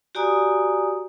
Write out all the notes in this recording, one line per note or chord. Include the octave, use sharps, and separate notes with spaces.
F#4 G4 D5 G#5 A#5 D#6